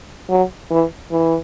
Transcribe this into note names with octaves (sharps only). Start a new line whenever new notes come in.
F#3
E3
E3